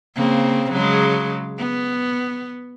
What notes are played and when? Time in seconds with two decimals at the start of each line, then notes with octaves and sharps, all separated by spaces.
0.16 C#3 A#3 C4
0.70 C#3 F#3 G#3
1.58 B3